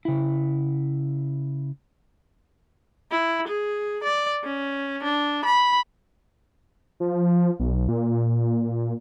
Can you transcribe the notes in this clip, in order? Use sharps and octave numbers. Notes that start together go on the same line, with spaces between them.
C#3 E4
E4
G#4
D5
C#4
D4
B5
F3
B1
A#2